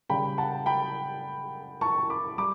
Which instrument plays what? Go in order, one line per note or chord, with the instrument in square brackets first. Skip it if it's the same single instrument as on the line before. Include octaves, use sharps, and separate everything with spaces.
[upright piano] C#3 G3 G5 B5
F#5 A5
G5 B5
A5 C#6
B5 D6
G3 B5 D6